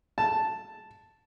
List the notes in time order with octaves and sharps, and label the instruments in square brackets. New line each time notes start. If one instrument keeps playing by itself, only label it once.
[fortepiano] A5